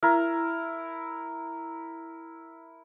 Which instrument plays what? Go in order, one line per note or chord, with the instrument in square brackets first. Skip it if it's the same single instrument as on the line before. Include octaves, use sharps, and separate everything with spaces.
[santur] E4 A#4